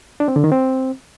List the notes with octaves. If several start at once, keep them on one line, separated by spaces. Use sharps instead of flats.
D4
C4
D3
D#3
C4